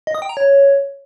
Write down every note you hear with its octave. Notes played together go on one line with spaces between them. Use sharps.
D#5
D#6
G5
A#5
C#5